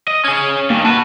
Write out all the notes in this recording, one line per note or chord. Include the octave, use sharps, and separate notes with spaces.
D#5
C#4 G#4 G#6
G2 D#3 A#3
F#4 B4 A5